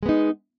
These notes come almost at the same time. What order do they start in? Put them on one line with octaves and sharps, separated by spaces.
G#3 B3 D#4